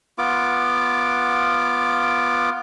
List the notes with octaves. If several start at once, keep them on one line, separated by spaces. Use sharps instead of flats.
B3 F4 D6